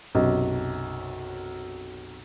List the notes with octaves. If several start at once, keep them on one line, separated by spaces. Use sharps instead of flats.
B1 F#2 C3